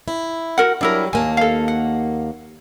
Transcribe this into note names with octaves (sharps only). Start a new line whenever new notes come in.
E4
F#4 A#4 F#5
F#3 G3 D4 E4 A#4
D#2 A#3 G#5 A5
A4 F5
F#5